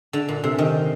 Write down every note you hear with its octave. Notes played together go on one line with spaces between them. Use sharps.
D3
A#2
C3
D#3